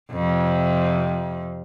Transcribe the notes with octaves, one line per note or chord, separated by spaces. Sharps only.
F2 C3